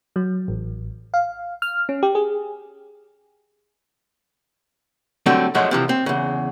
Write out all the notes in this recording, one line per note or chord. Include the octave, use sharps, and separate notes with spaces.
F#3
A1
F5
F6
C#4
G4
G#4
D3 F#3 G3 A3 C4 A5
F#2 F3 F#3 G#3 A3
C3 E3 F3
C4
E2 C#3